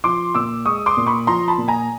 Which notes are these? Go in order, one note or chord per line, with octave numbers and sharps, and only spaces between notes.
F3 C6 D6
A#2 D6 E6
G#3 C#6 D#6
C6 D6
A#2
B5 C#6
F3 A#5 C6
A5 B5
A#2
G#5 A#5